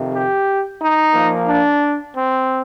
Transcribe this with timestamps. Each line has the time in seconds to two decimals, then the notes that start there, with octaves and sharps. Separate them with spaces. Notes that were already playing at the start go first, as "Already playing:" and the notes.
Already playing: F2 C3 D#3
0.13 G4
0.80 D#4
1.14 A#2 F3 A#3
1.48 D4
2.15 C4